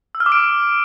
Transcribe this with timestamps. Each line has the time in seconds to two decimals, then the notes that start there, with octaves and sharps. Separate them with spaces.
0.15 E6
0.20 F6
0.26 D6
0.32 D7